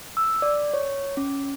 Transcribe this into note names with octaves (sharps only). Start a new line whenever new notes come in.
E6
D5
C#5
C#4